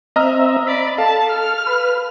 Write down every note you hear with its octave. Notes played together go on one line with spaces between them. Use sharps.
C4 D#5 E5 A#5 F6
D5 B5
A4 F5 A5
F6
B4